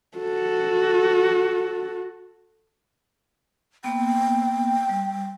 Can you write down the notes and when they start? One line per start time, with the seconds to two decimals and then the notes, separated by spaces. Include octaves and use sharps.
0.18 F#4 A4
3.84 A#3 B3 G5
4.89 G3